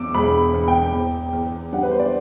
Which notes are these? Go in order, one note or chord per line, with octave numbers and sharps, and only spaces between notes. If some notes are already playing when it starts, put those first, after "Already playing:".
Already playing: E2 D6 E6
E1 B5
E2
G5
E2
E2
G3 F#5
B4
C5
D5